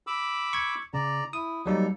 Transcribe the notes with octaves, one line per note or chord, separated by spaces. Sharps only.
B5 D6 E6
C#6 G#6
C#3 D5 A#5
E4 D#6
F#3 G3 A#3 D#4 A4